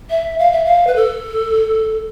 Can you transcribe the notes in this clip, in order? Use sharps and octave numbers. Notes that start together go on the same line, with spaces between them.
E5
F5
E5
F5
B4
A4